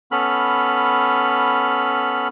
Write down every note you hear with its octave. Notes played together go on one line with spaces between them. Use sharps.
B3 C#4 A4 B5 F6